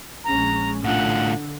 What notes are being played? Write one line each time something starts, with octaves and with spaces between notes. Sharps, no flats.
A#1 G#3 C#4 A#5
A2 D3 F4 F#5